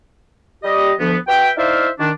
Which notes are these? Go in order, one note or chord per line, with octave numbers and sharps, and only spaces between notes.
G3 G4 D#5
D2 F3 B3
F#4 B4 E5 G5
D#4 E4 C5 D5 E5 F5
D#3 D4